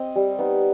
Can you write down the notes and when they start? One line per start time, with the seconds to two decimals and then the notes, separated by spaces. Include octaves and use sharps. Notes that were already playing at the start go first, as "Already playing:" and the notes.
Already playing: C4 D#5
0.16 G3
0.39 B3 D#4